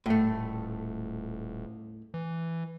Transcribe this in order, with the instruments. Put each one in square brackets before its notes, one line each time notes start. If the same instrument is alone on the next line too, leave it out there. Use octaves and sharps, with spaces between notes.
[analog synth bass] D#1 [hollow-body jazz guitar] A2 A3
[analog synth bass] E3